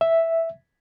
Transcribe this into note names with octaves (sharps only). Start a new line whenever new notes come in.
E5